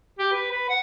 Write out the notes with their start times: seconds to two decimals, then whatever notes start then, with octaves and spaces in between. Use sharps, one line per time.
0.19 G4
0.32 B4
0.51 B4
0.69 F#5